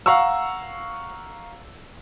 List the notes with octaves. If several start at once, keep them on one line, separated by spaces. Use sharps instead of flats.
F5 F#5 A#5 C#6 E6